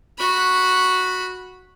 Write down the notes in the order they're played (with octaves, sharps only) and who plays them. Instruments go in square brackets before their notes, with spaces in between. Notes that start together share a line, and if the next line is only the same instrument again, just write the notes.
[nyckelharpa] F#4 B5